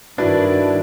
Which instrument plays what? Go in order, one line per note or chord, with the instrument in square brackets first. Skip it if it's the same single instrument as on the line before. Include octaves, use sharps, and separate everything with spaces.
[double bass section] G2 D#3 [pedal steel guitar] D4 [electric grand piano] E4 B4 D5 [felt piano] F#4